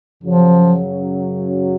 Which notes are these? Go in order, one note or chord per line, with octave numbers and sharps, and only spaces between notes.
F#2 C#3 F3 F#3